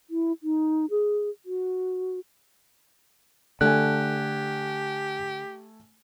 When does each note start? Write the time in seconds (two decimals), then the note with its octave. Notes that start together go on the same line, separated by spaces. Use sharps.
0.10 E4
0.43 D#4
0.90 G#4
1.46 F#4
3.61 D3 A3 G4 G#5 F#6